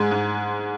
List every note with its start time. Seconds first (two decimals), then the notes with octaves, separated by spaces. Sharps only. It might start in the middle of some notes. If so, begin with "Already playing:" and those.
Already playing: G#2 G#3 G#5
0.11 G#2